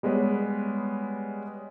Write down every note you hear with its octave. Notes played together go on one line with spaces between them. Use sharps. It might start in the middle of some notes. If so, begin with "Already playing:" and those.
G3 G#3 B3 B4 C#5